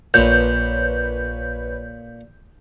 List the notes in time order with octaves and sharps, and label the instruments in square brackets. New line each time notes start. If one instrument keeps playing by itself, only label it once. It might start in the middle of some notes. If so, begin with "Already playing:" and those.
[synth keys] A#1 B4 C#5 [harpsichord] A#2 [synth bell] G6